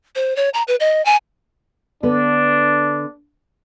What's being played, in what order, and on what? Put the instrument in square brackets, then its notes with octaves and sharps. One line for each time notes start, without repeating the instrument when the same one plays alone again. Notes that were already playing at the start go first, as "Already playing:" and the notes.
[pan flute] C5
C#5
A#5
B4
D#5
G#5
[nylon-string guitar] D3 B3 [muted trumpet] D4